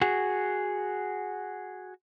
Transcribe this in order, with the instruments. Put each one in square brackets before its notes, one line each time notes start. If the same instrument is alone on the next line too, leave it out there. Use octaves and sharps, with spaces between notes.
[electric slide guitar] F#4 G#4